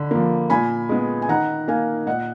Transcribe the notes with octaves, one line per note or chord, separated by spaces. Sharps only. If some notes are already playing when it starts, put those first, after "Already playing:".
Already playing: D3 B5
F3 A#3
A#2 G#5 B5
G#3 B3
G#5
D#3 F#5 A#5
A#3 F5 G#5
A#2 D#5 F#5